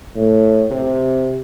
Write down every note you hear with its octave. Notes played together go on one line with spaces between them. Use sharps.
A2
C3